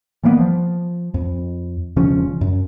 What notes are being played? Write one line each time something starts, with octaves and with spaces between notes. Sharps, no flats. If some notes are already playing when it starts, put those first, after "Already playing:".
E3 G3 A#3 B3
F3
F2
E1 C#3 F3 C#4
F#2